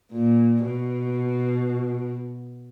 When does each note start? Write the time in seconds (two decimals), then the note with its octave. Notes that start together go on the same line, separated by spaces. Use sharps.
0.11 A#2
0.66 B2